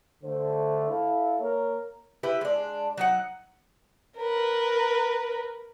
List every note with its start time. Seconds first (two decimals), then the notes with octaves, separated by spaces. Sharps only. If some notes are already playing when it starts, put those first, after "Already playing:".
0.24 D3 A3 C5
0.89 E4 A4 F5
1.39 A#3 A#4 C#5
2.23 E4 G4 B4 E5
2.41 G#3 D4
2.97 F#3 D#4 F#5
4.18 A#4 B4